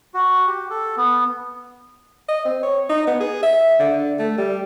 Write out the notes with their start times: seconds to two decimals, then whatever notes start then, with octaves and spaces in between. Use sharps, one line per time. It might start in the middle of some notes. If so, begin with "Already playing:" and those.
0.14 F#4
0.47 G4
0.70 A4
0.97 B3
2.28 D#5
2.45 C4
2.63 C#5
2.89 D#4
3.07 B3
3.20 G#4
3.43 E5
3.80 D3
4.19 A3
4.38 G3